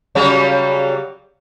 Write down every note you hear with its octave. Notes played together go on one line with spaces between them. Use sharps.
C#3 F#3 G3